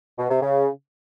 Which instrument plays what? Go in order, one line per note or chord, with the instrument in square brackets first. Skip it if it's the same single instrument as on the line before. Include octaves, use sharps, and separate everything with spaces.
[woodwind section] B2
C3
C#3